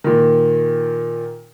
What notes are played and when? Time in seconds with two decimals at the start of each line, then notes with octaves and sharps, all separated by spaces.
0.04 A#2 D#3